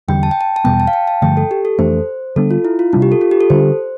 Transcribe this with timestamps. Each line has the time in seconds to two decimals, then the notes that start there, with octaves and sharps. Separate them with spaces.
0.08 E2 D3 G3 G5
0.23 A5
0.31 G5
0.41 A5
0.56 A5
0.65 E2 B2 G3 B3 G5
0.80 A5
0.87 F5
0.93 G5
1.08 A5
1.22 G2 D3 F3 A3 G5
1.37 A4
1.51 G4
1.65 A4
1.79 F2 E3 A3 D4 C5
2.36 D3 G3 B3 D4 A4
2.51 F4
2.65 E4
2.79 F4
2.93 C3 G3 D4 F4
3.02 G4
3.12 A4
3.21 F4
3.31 G4
3.41 A4
3.50 D3 G3 D4 C5